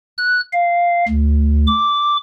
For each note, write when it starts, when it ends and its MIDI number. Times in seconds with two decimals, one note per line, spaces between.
0.18 0.40 90
0.53 1.05 77
1.08 1.66 38
1.67 2.17 86